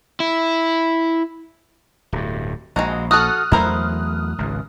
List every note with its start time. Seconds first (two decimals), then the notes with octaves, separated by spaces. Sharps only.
0.20 E4
2.12 D1 G2
2.76 A#1 G#3 D#4 F#4
3.11 F#4 A4 D#6 F6 F#6
3.52 E2 F#3 A3 E4 A#4 C5
4.38 G#1 C#2